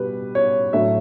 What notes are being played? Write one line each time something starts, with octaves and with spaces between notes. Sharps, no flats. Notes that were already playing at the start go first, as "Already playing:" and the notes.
Already playing: B2 G3 B4
C#5
A2 F#3 A3 D4 E5